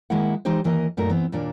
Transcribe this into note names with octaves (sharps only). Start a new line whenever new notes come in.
D#3 G#3 A#3 E4 D#5 F#5
E3 G#3 D#4 G4 C5
D#2 E3 A#3 A#4 C5 D#5
F#2 A#2 A3 D#4 A#4
E3 B3 C4
D#2 A#2 A#3 D4